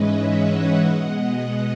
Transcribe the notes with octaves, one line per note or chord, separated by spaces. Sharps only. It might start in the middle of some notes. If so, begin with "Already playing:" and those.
Already playing: G#2 E3 G#3 C#4 B4 C#5 D#5 E5
D#5 F#5
B2 G#3 B3